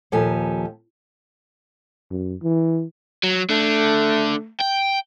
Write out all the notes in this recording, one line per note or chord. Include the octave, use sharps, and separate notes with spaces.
D#2 A#2 F3 G4 A4 G#5
F#2
E3
F#3
D3 A3
G5